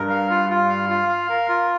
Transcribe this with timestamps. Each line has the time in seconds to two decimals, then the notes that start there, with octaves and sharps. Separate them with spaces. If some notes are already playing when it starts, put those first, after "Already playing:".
Already playing: G2 A#4
0.10 F5
0.30 F4
0.50 F4
0.69 F5
0.89 F4
1.09 F5
1.29 A#4
1.49 F4